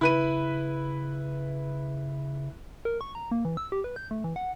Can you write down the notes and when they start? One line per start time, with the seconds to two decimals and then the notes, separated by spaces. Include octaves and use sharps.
0.01 C#3 E4 B4 D#7
2.85 A#4
3.01 C#6
3.15 A#5
3.31 A#3
3.45 E3
3.57 E6
3.72 G4
3.84 B4
3.96 G6
4.11 A3
4.24 E3
4.36 F#5